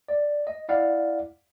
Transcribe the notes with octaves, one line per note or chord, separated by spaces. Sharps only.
D5
D#5
E4 D5 F5 F#5